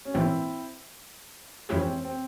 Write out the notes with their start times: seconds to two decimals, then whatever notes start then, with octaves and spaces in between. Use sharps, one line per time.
0.05 C#4
0.14 A#1 G#2 E3 A#3 C4 E4
1.69 F2 E3 G#3 C#4 E4 G4
1.81 C4
2.05 C4